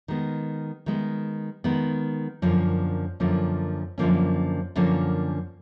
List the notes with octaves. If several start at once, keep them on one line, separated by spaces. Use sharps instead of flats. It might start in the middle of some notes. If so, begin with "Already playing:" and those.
D#3 G#3 B3
D#3 G#3 B3
D#3 G#3 B3
F#2 D3 F3 A#3 C#4
F#2 D3 F3 A#3 C#4
F#2 D3 F3 A#3 C#4
F#2 D3 F3 A#3 C#4